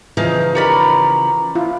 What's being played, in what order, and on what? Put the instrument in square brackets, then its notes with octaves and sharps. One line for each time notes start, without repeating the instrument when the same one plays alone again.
[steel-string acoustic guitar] C#3 E3 F3 [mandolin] D#4 F5
[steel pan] D#4 G4 A#4 [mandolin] C#5 D5 B5 [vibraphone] A#5
[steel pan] E4 F4